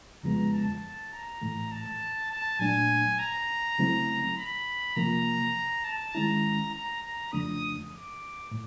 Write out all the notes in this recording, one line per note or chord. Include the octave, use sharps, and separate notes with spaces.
F2 C#3 F3 G#3 B3 A#5
A5
A#5
A2 E3 A3
A5
A5
A#2 F#3 A3 D4 G#5
A#5
C#3 F#3 A3 C4 E4
B5
C3 F3 A#3 A#5
A5
D#3 G#3 C#4 E4 A#5
A#5
A#5
F2 C#3 F3 A3 D4 D#6
D6
A2